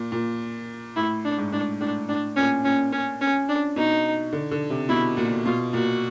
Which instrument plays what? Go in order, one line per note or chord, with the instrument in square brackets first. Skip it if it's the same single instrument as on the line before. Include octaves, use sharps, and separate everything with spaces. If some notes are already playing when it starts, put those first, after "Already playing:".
Already playing: [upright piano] A#2
A#2
[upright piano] A2 [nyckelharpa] E4
[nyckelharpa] D4
[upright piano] G#2
[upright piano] A2 [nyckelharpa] D4
[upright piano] A2 [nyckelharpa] D4
[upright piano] A2 [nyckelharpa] D4
[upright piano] A#2 [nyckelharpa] C#4
[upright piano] A#2 [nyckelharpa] C#4
[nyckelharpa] C#4
C#4
D4
[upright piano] B2 [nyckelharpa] D#4
[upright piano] D3
D3
C3
[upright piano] B2 [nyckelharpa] E4
[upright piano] A#2 [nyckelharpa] F#4
[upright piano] B2 [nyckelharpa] F4
[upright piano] A#2 [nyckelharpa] F#4